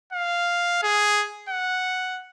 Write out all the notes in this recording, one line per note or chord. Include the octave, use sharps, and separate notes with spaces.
F5
G#4
F#5